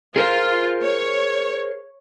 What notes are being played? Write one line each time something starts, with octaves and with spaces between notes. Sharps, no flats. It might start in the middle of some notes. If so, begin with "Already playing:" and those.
F4 G#4 A#4 C5
C#5